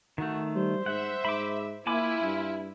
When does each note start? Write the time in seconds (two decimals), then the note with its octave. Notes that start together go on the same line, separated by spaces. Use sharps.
0.18 D#3 A3 F#4
0.56 G3 C5
0.86 G#2 E5 F#5
1.25 G#2 B5 D6
1.87 A#3 E4 F4 G#5 B5 D6
2.22 G2